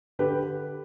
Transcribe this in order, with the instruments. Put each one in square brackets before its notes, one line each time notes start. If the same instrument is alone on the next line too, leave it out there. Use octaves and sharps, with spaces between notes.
[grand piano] D3 G4 B4